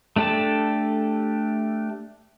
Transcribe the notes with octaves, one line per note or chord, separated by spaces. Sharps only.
A3 D4 G4 A4 A5